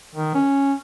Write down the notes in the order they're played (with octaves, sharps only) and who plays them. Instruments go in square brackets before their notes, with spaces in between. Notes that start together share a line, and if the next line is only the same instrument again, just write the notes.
[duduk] D#3
C#4